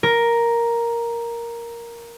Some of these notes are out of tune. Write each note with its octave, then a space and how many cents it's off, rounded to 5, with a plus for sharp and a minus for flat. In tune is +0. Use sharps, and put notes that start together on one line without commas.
A#4 +5